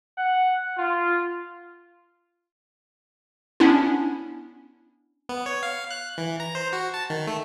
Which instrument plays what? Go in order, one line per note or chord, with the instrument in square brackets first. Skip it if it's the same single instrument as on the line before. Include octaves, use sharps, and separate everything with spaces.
[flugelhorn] F#5
F4
[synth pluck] B3 C#4 D4 E4
[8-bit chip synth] B3
C#5
F5
F#6
E3
A#5
C5
F#4
A5
D#3
A3